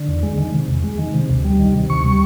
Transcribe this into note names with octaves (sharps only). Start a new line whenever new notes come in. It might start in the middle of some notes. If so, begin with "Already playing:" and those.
Already playing: D3
E2
G#3
D#3
C3
E2
G#3
D#3
C3
D2
G3
D#3
C3
D2 C#6
G3